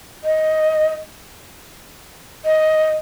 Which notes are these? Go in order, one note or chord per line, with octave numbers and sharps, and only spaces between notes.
D#5
D#5